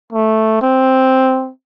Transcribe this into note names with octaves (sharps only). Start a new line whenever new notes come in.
A3
C4